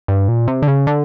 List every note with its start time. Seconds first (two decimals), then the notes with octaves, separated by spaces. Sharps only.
0.08 G2
0.28 A#2
0.48 C3
0.62 D3
0.68 C#3
0.87 D3